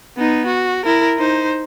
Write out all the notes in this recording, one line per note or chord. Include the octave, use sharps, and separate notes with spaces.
B3 D#4
F#4
E4 A#4
D#4 C5